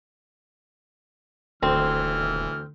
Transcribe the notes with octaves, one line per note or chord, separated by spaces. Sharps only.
D#1 D2 E3 C4 F6